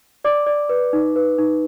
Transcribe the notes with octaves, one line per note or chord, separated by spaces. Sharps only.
D5 D6
D5
B4
D#4
B4
D#4